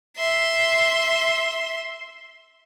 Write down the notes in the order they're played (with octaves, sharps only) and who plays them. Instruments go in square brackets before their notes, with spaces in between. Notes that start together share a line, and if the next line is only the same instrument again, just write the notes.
[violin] E5 C6